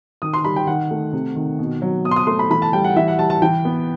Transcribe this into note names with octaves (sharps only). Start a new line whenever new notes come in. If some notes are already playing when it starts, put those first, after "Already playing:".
D#3 D#6
C6
G3 B5
G5
D#3 F#5
A3
C3
D#3
B2
F#3
B2 D#6
C6
D#6
A3 C6
B5
E3 B5
A5
G3 G5
F#5
E3 E5
F#5
G3 A5
A5
E3 G5
B3